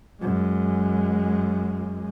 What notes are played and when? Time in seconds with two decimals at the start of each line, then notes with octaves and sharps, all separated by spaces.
0.22 F#2 G#3